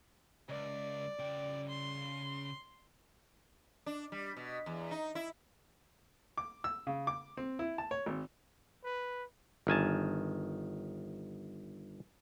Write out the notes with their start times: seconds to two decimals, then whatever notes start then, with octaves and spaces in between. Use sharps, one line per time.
0.49 C#2 D5
1.19 C#3 G5
1.70 C6
3.86 D4
4.12 G3
4.37 B2
4.66 E2
4.91 D#4
5.15 E4
6.38 D6
6.64 E6
6.87 C#3
7.07 D6
7.37 C4
7.59 E4
7.78 A5
7.91 C#5
8.06 G#1
8.84 B4
9.67 G1 D#3 G#5 A5